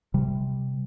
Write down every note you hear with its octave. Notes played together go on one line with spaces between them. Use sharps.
C3 G3